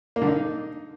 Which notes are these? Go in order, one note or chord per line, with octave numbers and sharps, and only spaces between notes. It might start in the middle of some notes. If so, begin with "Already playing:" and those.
A#3
D3
D#4